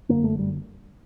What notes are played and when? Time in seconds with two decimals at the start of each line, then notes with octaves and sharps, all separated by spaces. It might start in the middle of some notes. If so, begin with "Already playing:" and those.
0.09 G1 F#2 D3 A#3
0.24 A3
0.39 G3